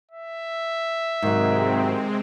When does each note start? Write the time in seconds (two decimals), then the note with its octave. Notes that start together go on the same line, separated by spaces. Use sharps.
0.12 E5
1.22 G#2 C3 D#3 F#3 G#3 C4